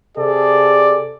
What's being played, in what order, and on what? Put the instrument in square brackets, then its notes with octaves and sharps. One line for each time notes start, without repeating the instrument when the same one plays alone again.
[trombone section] C3 G#4 A4 [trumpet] D5